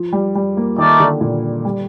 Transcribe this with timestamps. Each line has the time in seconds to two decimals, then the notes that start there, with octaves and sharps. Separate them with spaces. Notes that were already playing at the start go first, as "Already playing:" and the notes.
Already playing: F3
0.13 G3
0.35 G3
0.57 A#3
0.78 D#3 A3 D#4 A#4 D5
1.00 D3
1.21 A#2
1.65 G3